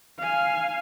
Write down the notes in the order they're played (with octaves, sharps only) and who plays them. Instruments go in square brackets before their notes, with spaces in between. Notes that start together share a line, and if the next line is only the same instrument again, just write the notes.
[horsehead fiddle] F5 G#5